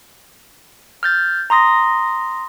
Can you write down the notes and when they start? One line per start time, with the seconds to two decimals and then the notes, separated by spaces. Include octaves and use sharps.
1.03 F6 G6 A6
1.50 A#5 C6 D#6 A#6